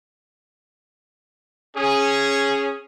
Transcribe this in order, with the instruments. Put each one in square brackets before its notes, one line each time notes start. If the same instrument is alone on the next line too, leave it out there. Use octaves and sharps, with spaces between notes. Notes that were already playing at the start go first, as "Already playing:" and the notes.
[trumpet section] C#4 G#4